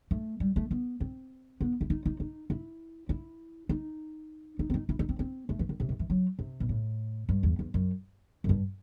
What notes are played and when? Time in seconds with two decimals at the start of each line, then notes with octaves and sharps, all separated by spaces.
0.11 A3
0.40 G3
0.56 A3
0.71 B3
1.00 C4
1.61 B3
1.81 E4
1.90 D#4
2.05 D#4
2.20 D#4
2.50 E4
3.09 E4
3.69 D#4
4.59 D#4
4.70 C4
4.74 D#4
4.89 E4
4.99 D#4
5.09 C4
5.19 C4
5.49 A3
5.59 E3
5.69 D#3
5.80 C3
5.89 D#3
5.99 E3
6.10 F#3
6.39 C3
6.60 B2
6.69 A2
7.29 G2
7.43 E2
7.59 E2
7.74 F#2
8.44 F#2
8.49 G2